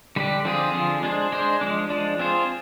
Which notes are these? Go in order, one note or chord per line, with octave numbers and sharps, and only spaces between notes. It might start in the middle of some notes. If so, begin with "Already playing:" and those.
D3 G3 D4 G4
D3 F3 C4 F4 G#4
D3 F3 C4 F4 G#4
G#3 D4 G#4 C5
G#3 D4 G#4 C5
F3 G#3 D4
F3 G#3 D4
C4 F4 G#4 C5